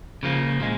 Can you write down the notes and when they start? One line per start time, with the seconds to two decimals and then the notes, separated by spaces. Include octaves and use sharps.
0.23 C#3 F3 A#3
0.60 A#2 G#3